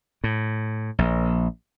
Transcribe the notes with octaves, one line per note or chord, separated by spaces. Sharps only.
A2
A#1